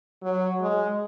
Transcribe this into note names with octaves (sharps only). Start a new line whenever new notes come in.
F#3
G#3